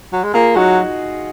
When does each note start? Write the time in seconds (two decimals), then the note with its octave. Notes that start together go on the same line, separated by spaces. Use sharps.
0.13 F#3
0.24 G#3
0.34 A#3 F4 G#4
0.56 F#3 D#4 F#4